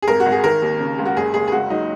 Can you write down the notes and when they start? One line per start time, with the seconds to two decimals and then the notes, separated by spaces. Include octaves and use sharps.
0.02 G#4
0.07 G#1 A#4
0.20 F#4
0.26 G#1
0.32 G#4
0.43 D#3 A#4
0.62 D#2
0.80 C#3
0.98 C#2
1.05 F#4
1.16 F#1 G#4
1.34 F#1 G#4
1.48 G#4
1.52 C#2 F#4
1.70 F#3 D#4